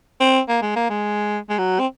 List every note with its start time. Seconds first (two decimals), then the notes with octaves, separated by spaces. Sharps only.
0.20 C4
0.49 A#3
0.62 G#3
0.76 A#3
0.90 G#3
1.50 G#3
1.58 F#3
1.79 C4